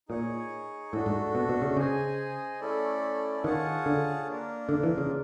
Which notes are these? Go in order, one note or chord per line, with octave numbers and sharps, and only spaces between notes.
A#2 D#4 G#4 C#5
A2 A3 D4 F#4 A4
G#2
B2
B2
C#3
C#3 G#4 C5 D#5 G#5
A3 C#4 E4 A4 D5
D#3 F4 G#4 C#5 F#5 A5
D3
A#3 D4 F4 A#4
D3
E3
C#3